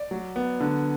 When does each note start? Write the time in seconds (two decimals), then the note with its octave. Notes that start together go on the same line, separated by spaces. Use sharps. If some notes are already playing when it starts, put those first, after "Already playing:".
Already playing: D5
0.11 F#3
0.36 B3
0.60 D3